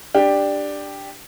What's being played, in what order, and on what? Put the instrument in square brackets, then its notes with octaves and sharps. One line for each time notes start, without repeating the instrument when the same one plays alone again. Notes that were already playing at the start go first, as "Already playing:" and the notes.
[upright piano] D4 G4